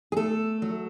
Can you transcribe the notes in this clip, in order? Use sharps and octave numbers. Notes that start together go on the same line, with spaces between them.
G#4
A3 A4
F#3